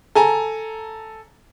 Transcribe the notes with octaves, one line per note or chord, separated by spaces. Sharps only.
A4 G#5 A#5